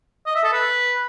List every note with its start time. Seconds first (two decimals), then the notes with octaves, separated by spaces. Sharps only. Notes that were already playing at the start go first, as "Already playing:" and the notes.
0.26 D#5
0.35 E5
0.44 A4
0.53 B4